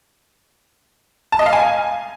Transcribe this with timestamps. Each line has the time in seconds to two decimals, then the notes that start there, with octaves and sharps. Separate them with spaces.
1.32 A5
1.39 D#5
1.46 F5
1.53 G#5